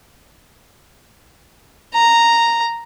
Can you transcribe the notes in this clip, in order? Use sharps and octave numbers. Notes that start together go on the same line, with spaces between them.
A#5